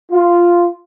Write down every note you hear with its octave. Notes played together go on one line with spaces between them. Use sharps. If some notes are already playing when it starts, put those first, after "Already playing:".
F4